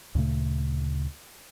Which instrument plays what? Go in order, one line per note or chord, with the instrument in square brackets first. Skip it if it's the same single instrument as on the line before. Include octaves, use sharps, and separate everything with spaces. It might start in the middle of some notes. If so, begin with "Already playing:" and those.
[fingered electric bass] D2 A#2 C#3 A3